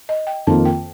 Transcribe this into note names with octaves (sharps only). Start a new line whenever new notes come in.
D#5
G5
F2 D#3 A#3 F4 A5
G5